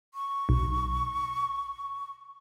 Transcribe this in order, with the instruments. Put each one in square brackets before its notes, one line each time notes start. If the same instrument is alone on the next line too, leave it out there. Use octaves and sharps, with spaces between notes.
[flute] C#6
[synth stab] B1